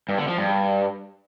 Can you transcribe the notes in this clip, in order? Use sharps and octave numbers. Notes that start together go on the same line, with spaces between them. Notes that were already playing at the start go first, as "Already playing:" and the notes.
G2
D3
F3
G2